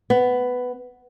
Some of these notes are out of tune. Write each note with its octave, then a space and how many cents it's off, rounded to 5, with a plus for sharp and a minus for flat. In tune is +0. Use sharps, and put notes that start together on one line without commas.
B3 +10